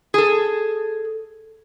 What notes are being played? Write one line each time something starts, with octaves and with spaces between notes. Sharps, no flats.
G#4 A4